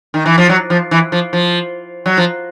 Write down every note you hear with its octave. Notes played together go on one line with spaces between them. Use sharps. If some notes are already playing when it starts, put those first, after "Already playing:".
D#3
E3
F3
F#3
F3
E3
F3
F3
F#3
F3